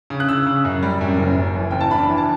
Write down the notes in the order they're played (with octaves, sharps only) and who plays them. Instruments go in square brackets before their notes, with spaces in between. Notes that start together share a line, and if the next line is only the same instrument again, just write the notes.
[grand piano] C#3
F#6
C#3 E6
C#3
F#2
G3
F#2
F#1
F#2
E3
F#1 G5
A5
D4 B5
E3
A5